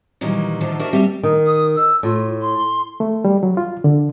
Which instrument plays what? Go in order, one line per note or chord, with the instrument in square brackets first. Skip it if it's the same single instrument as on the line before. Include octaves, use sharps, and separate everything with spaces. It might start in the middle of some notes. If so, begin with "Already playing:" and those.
[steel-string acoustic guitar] A#2 D#3 E3 F#3 G3
A2 D3 D#3 F3 F#3 A3
D4 E4 F#4 G4 A#4 E5
G3 A#3 C4 G4 E5
[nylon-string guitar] D#3 D#4
[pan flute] D#6
E6
[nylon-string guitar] A2 [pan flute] F4
[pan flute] C6
[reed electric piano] A3
G3
F#3
F4
D3